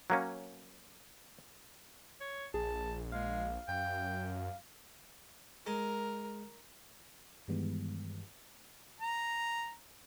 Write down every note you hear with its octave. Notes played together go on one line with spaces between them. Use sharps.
F#3 A#3 C#4
C#5
A#1 G#4 A5
G#3 F5
F#2 G5
G#3 A#4
G2 D#3 E3 G3 G#3 B3
A#5